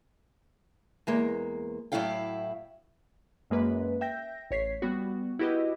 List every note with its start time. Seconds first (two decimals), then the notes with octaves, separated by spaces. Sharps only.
1.07 E2 G#3 A#3
1.92 A2 F#3 G#3 E4 F5 G5
3.50 F#2 G#3 A#3 B4
4.01 E5 G5 G6 A#6
4.51 A1 C#5 B6 C7
4.82 G3 B3 F#4
5.39 E4 F#4 G4 B4 D#5